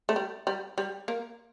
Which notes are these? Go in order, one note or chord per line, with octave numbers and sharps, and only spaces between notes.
A3
G3
G3
G3
A#3